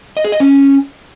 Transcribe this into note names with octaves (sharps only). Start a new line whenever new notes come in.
D#5
G#4
D#5
C#4